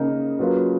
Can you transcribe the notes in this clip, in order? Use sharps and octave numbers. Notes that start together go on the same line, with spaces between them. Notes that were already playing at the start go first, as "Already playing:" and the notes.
Already playing: C#3 A#3 D#4 A#4
F#3 A#3 F4 B4